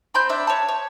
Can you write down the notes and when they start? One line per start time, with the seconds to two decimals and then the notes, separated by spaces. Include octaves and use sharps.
0.14 C4 B5 C6 G6
0.29 D4 E5
0.47 C#5 A5
0.69 C#5